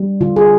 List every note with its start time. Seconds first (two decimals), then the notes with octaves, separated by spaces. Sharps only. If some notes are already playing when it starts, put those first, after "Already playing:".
Already playing: G3
0.21 D3 F4
0.36 G#4